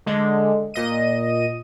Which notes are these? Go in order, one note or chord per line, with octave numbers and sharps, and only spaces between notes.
D3 G#3
A#2 D#5 D#7